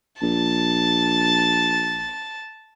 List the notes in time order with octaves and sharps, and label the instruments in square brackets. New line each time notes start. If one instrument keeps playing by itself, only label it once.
[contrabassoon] A#1 [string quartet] A5